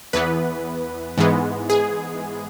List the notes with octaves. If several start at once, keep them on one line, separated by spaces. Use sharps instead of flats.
E2 E3 B3 B4
G#2 E3 G#3 B3
G#4